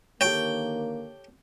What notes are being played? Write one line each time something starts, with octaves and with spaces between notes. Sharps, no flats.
D3 D#3 A#3 G4 A4 C#5 G5